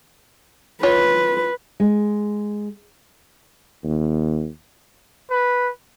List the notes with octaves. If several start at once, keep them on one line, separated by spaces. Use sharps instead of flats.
F4 B4 C#5
G#3
D#2
B4